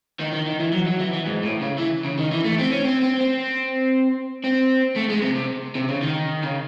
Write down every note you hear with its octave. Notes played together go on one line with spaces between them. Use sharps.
D#3
D#3
D#3
E3
F#3
F#3
E3
E3
G#2
A2
C#3
E3
C#3
D#3
E3
A3
C4
C#4
C4
C4
C4
C4
A3
G#3
C3
C3
C3
C#3
D#3
C#3